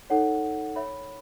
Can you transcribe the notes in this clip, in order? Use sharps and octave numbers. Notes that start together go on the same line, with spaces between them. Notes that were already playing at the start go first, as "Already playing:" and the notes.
D#4 A4 C#5 F#5
C#5 E5 B5